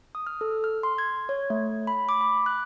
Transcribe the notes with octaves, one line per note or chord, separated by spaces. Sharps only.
D#6
F6
A4
F6
C6
G#6
C#5
A3
B5
D6
B5
F#6